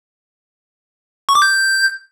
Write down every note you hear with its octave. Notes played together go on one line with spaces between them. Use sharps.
C#6
D6
G6